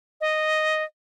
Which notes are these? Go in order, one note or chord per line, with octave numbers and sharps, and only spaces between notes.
D#5